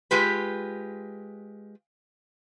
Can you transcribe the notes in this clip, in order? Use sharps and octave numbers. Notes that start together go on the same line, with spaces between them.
G#3 F4 G4 B4